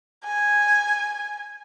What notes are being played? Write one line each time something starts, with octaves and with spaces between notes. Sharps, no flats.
G#5